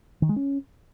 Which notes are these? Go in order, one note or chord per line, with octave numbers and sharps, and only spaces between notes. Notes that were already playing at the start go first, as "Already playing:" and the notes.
D#3
G#3
C#4